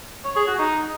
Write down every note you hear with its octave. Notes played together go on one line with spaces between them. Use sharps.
C#5
G#4
F#4
D#4